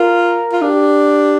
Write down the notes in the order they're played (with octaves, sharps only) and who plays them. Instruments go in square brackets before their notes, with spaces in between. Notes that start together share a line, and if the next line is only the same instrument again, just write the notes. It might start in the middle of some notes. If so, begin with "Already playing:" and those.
Already playing: [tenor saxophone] F4 [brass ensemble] A#4
[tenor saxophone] F4
[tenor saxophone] D4 [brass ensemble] G4